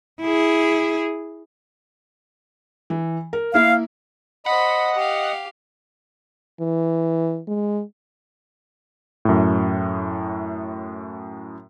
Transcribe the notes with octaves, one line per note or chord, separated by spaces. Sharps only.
E4 G#4
E3
A#4
A#3 E4 E5 F5
C5 D#5 F#5 B5
G4 F5
E3
G#3
F#2 A2